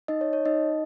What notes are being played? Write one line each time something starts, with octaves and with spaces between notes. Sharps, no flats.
D#4 D#5
C#5
C#5
D#4 D#5